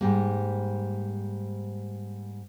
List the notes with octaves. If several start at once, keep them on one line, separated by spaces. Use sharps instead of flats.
G#2 G3 A#3